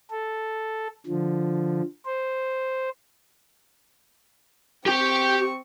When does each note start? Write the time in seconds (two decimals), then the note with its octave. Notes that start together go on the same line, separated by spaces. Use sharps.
0.11 A4
1.07 D3 F3
2.06 C5
4.86 C4 G4 G5 C#6